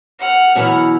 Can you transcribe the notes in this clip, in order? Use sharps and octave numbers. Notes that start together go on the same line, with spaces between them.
F#5 F6
F#2 B2 E3